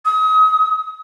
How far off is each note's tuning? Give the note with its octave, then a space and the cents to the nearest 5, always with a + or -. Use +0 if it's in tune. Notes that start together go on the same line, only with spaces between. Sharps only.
D#6 +35